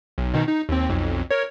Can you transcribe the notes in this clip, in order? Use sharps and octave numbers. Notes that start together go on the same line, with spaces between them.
B1
B2 D#3 D#4
D#4
D#2 C4
B1 F2
A#4 C#5